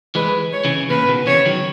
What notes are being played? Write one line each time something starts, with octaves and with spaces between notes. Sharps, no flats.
E3 G#3 B4
C#5
C#3 E3
A#2 C#3 B4
B2 D#3
C#3 E3 C#5
D#3 F#3